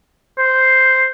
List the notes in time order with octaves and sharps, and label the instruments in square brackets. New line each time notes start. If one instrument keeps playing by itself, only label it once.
[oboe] C5